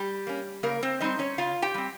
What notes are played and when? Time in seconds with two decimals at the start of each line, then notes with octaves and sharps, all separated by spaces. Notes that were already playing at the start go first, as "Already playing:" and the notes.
Already playing: G3 G4
0.27 A#3 C#4
0.63 C#3 A#3 A#4
0.83 C4 C5
1.00 G3 C4 D#4 D#5
1.19 C#4 C#5
1.38 C#3 F4 F5
1.62 G4 G5
1.74 G3 C4